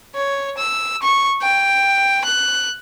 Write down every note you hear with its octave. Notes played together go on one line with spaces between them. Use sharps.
C#5
E6
C#6
G5
F#6